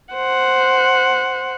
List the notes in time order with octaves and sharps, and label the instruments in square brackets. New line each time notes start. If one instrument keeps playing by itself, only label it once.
[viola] C5 F#5